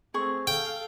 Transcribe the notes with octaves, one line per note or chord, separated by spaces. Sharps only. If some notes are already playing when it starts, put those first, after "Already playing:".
A3 C4 G#4 C#6
A4 F5 G5